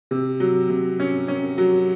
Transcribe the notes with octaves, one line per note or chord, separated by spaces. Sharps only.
C3
F#3
C3
C#4
C#4
F#3